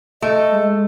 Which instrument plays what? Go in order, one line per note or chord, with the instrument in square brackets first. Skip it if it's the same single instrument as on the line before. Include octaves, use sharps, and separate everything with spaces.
[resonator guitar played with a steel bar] A3 [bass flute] D#5
[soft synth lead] G#3